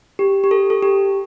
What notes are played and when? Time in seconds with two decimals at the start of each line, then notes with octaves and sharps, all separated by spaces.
0.19 G4
0.44 G4
0.51 A4
0.70 A4
0.83 G4